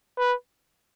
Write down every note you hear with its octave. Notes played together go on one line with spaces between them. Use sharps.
B4